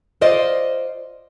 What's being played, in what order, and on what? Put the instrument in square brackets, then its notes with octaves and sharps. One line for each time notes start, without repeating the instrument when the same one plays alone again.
[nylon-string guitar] F4 C5 D5 D#5